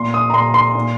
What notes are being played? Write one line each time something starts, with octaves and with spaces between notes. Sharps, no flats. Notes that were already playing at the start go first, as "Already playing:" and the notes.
Already playing: A#2 C6
D#6
A#5
A#2 C6
C6
A#2